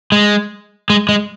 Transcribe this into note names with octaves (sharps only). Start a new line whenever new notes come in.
G#3
G#3
G#3